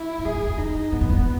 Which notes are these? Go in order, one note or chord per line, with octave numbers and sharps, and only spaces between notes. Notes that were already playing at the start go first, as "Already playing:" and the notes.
Already playing: E4
F#2
G#2 G#4
F#2
E2
F#2 D#4
G#2 B3
F#2
E2